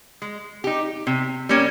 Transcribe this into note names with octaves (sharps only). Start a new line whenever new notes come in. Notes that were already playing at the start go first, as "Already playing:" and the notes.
G#3
D#4 G4
C3
G3 A#3 C#4